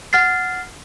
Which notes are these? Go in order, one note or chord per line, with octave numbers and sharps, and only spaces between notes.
F#5 F6 A6 C7